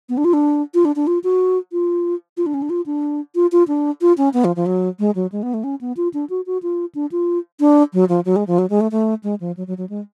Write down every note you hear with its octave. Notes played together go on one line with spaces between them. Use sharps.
B3
D4
F4
D4
F4
D4
D4
F4
F#4
F4
F4
D4
C#4
D4
F4
D4
F4
F4
D4
F4
C#4
B3
F3
F3
F#3
G#3
F#3
G#3
B3
A3
C#4
B3
F4
D4
F#4
F#4
F4
D4
F4
D4
F#3
F3
F#3
G#3
F3
F#3
G#3
A3
A3
G#3
F3
F#3
F#3
F#3
G#3